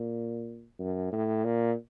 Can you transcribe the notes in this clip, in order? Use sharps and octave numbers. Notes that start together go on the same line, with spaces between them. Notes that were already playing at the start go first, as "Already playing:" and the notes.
Already playing: A#2
F#2
A2
A#2